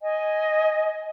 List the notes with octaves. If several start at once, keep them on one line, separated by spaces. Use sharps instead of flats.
D#5 G#5